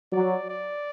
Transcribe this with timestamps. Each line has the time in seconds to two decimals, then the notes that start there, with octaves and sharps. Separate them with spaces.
0.13 F#3 D5
0.50 D5